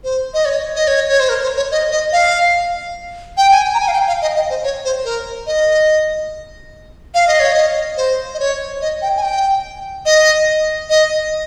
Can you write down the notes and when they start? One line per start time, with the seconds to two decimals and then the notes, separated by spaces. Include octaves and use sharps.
0.04 C5
0.34 D#5
0.45 C#5
0.76 D#5
0.87 C#5
1.09 C#5
1.20 C5
1.29 A#4
1.43 C5
1.57 C#5
1.71 D#5
1.92 D#5
2.13 F5
3.37 G5
3.51 G#5
3.64 G5
3.74 A#5
3.80 G#5
3.88 F5
3.93 G5
4.08 F5
4.22 D#5
4.36 D#5
4.50 C5
4.63 C#5
4.85 C5
5.04 A#4
5.47 D#5
7.14 F5
7.27 D#5
7.40 C#5
7.52 D#5
7.97 C5
8.34 D#5
8.40 C#5
8.81 D#5
9.02 G5
9.17 G#5
9.23 G5
10.06 D#5
10.90 D#5